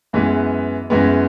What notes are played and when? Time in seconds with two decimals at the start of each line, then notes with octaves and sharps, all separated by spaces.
0.13 F#2 E3 G#3 B3
0.90 F#2 E3 G#3 B3